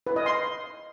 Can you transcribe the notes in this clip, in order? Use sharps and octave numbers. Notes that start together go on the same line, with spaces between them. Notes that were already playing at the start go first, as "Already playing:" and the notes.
B4
D#5
C6